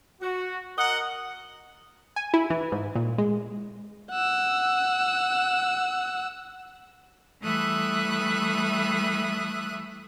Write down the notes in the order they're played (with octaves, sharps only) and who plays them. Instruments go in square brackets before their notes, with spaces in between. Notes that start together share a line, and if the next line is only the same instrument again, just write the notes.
[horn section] F#4
A#4 D#5 F#5
[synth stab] G#5
E4
E3
G#2
A#2
G#3
[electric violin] F#5 E6
[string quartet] E3 G3 A3 E5 D#6 F#6